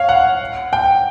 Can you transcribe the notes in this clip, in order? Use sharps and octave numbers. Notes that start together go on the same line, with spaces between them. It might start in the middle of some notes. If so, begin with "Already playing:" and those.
Already playing: C#5 F5
F#5
G5